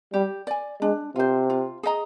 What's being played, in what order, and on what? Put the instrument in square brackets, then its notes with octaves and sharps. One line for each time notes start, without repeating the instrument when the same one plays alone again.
[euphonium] G3 [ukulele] G4
[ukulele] D5 G#5
[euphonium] G#3 [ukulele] D4
[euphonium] C3 [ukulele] F4 C5
[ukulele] F4
G#4 D#5 A#5